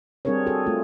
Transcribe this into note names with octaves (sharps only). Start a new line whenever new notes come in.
G3 C4 D4 G#4 A#4 C#5
F#4 G#4 A4
A3 F4